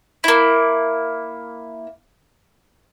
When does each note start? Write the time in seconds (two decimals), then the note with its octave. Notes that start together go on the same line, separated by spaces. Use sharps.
0.24 A#3 E4